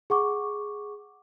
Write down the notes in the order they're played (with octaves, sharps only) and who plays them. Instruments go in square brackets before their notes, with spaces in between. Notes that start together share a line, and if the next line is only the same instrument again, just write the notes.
[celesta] G#4 F#5 C#6 D6